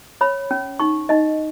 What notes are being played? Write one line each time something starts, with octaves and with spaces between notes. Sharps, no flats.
C#5 B5
C#4
D#4 C#6
D#4 D#5